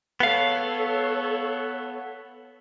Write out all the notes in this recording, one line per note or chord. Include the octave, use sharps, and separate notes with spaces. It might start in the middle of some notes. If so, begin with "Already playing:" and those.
B3 A4 C#5 F5